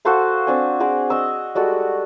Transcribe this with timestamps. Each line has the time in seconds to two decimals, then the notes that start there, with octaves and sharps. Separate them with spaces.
0.05 F#4 A4 C5 F5
0.47 C4 D4 G#5
0.80 F#4 G#4 C5 D6
1.10 D#5 C#6 E6
1.55 G3 G#3 F#4 A4